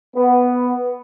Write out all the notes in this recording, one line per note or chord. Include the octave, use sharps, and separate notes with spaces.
B3